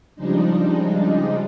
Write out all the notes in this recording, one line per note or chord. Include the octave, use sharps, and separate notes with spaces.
C#3 F3 G3 G#3 D4 D#4